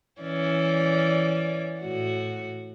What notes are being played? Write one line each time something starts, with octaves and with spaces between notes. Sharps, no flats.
E3 C#4 D5
A2 F#4